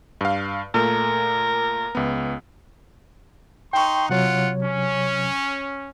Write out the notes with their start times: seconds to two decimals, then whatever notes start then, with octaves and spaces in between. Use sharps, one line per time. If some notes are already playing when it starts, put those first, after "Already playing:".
0.21 G2 F5
0.74 A#2 A3 A#4
1.95 C#2 B3
3.73 D#4 G5 C6 C#6
4.09 C3 F#3 F4 C#5 F#5
4.63 C#4